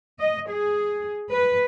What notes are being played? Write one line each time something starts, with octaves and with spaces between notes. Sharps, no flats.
D#5
G#4
B4